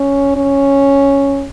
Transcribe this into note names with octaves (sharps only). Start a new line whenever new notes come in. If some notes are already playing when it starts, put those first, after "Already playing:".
Already playing: C#4
C#4